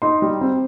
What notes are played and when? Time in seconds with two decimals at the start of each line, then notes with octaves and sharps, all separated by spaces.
0.02 D#4 C6
0.22 G3
0.41 C4